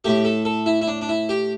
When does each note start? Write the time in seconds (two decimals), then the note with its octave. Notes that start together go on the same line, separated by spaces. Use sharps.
0.04 A2 A3 G4
0.25 A4
0.45 A4
0.66 E4
0.82 E4
0.88 D4
1.01 D4
1.09 E4
1.29 G4